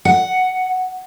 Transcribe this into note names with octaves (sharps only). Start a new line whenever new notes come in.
F#5